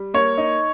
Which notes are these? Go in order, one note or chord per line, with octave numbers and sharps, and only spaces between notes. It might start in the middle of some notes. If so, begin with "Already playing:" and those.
Already playing: G3
A#3 C#5
D#4